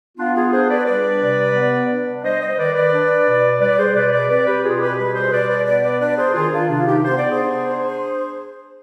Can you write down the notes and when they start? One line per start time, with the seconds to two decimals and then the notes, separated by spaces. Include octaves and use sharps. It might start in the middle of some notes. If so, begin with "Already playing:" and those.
0.18 B3 D4 F4
0.35 F4 G#4
0.52 D4 G#4 C5
0.69 B4 D5
0.86 G3 B4 D5
1.21 C3
1.55 B3
1.89 D4
2.24 G3 C5 D#5
2.41 C5 D#5
2.58 D#3 B4 D5
2.75 B4 D5
2.92 D4
3.27 B2
3.60 G3 B4 D5
3.78 G#4 C5
3.95 B2 B4 D5
4.12 B4 D5
4.29 C4 B4 D5
4.46 G4 B4
4.63 B2 F4 G#4
4.80 G4 B4
4.98 G3 G4 B4
5.14 G#4 C5
5.31 B2 B4 D5
5.49 B4 D5
5.66 B3 B4 D5
5.83 B4 D5
6.00 D4 B4 D5
6.18 G#4 C5
6.34 D#3 F4 G#4
6.52 D4 F4
6.68 C3 D4 F4
6.86 D#4 G4
7.03 B3 C5
7.17 D5
7.30 G#4 C5
7.37 D4